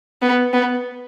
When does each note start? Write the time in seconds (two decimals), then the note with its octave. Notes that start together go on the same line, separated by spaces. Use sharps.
0.22 B3
0.53 B3